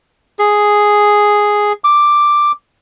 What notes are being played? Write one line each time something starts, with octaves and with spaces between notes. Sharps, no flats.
G#4
D6